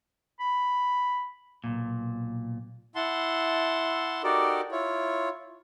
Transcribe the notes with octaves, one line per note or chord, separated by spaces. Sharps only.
B5
B1 F2 A#2
E4 F#5 A5 C6
D#4 F#4 G4 A4 A#4 D5
E4 F4 C#5